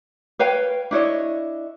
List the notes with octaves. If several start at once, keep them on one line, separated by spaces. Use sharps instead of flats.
B4 C#5 F5 G5
D4 E4 C#5 D#5